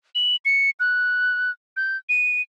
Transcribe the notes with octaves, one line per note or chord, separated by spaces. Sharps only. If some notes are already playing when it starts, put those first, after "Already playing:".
F#7
C#7
F#6
G6
D#7